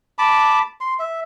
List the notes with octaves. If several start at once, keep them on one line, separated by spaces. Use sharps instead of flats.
A5 B5 D6
C6
E5